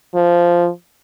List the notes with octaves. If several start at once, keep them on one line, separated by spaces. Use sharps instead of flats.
F3